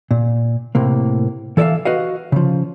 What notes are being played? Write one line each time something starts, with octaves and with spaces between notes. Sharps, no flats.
A#2
A2 C3 A#3
E3 A4 C#5 D5 E5 F5
F#4 B4 D#5 F5
C#3 F3